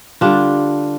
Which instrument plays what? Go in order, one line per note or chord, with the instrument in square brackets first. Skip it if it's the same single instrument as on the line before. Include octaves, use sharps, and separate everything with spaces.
[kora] D3 G3 D4 F4